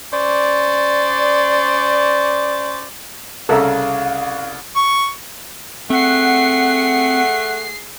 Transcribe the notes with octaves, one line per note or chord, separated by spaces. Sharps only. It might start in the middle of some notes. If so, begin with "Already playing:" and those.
C#4 C5 D5
C2 C#3 A4 A#4 E5 F5
C#6
A3 C4 G#4 F#5 C7